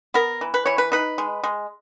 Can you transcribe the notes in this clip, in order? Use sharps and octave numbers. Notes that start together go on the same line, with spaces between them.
B3 A#4
E3
B4
E3 C#5
B4
D#4 B4
G#3
G#3